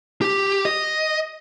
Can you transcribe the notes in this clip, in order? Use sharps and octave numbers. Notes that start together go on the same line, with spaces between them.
G4
D#5